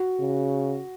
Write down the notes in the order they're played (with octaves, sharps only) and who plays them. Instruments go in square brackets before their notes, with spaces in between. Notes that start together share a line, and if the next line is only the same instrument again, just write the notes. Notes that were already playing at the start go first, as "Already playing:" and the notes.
Already playing: [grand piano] F#4
[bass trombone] C#3